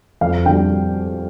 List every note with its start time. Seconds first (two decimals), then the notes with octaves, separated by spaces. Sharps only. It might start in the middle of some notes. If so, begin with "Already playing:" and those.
0.21 F2 F5
0.46 D3 G5
0.50 G3